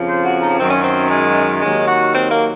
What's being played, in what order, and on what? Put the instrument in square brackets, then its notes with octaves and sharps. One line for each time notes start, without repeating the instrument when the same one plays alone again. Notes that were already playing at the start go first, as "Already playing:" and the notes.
Already playing: [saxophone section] F2 C#3 F3
C5
F#4
D#4
F#2 D#3 F#3 C4
C#4
C4
G#3
D#2 D#3 F#3 G#3
F#4
C4
A#3